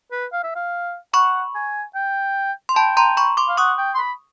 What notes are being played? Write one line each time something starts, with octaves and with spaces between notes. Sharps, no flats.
B4
F5
E5
F5
F#5 B5 C#6
G#5
G5
C6
G5 A5 B5
A#5 C6
B5 C#6
C6 D6
F5
F#5 C#6 D#6
G5
C6
B5